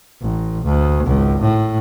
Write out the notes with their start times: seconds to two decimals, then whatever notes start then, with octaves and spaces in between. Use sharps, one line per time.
0.22 A1
0.65 D2
1.07 G#1 C#2
1.41 A2